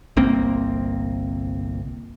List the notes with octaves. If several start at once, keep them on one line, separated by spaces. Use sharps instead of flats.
G1 C2 A#3 C4